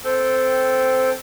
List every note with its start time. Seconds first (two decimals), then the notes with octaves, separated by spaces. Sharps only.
0.04 C4 A4 G5